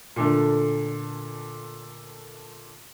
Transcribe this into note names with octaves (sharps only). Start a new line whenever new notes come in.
A#2 D3 A3